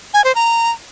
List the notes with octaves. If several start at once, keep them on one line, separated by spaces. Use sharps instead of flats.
G#5
C5
A#5